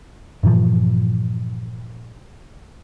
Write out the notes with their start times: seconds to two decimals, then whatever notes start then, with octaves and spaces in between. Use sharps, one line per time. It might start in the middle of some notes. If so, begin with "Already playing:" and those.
0.43 G2 A#2 E3 F3